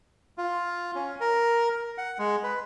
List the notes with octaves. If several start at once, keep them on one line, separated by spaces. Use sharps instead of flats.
F4
C#4
A#4
F#5
G#3
B4